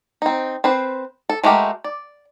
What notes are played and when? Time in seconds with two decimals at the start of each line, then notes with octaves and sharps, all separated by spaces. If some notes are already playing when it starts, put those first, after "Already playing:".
0.22 C4 D#4
0.64 C4 B4 C5
1.30 A4
1.44 G#3 A3 F#4 G4 A#4
1.84 D5